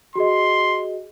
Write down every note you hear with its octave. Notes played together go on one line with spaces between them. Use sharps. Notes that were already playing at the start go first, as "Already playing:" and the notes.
F#4 G#4 D#5 C6